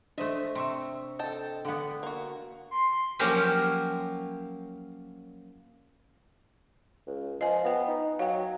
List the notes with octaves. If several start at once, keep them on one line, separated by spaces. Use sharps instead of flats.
A3 D4 C5 D#5 E5
C3 C6 C#6 E6
A4 D#5 G5 A5
D3 B3 G4 F#5
A#3 F#4
C6
F3 F#3 A#3 C#4 G4 A#4
C#2
F3 D#5 G#5
B3 C5 G5
D#4
F#3 F5 G5